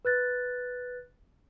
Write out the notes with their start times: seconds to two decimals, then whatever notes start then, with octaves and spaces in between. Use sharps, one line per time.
0.05 B4 F#6 A6